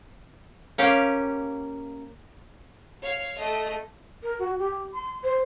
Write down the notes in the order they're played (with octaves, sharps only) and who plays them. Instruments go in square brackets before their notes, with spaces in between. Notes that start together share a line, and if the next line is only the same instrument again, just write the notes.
[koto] A#3 C#4 G4 F5
[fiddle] C#5 F5
A3 D#5
[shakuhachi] A#4
F#4
G4
C6
C5